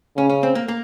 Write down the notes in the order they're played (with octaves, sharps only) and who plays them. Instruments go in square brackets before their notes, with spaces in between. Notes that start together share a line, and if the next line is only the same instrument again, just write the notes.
[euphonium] C#3 [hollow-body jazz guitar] C#4
[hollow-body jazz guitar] C#4
C4
A#3
A#3